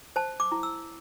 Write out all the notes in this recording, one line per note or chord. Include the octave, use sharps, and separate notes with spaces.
C5 A5
D6
E4
E6